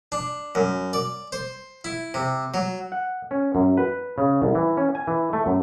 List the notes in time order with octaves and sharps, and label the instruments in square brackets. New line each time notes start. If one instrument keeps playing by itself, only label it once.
[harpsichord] D4
F#2
D5
C5
E4
C3
F#3
[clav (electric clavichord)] F#5
C#4
F#2
B4
C#3
C2
E3
C#4
G#5
E3
A3
F#2